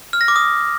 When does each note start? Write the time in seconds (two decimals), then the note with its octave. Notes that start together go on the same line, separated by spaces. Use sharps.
0.13 F6
0.21 A#6
0.28 D6
0.36 D#6